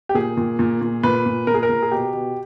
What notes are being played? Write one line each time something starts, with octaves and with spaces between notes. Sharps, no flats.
G4
A#2 G#4
A#2
A#2
A#2
A#2 B4
A#2
A#2 A#4
G#4
A#4
A#2
G#4
B2 G4
B2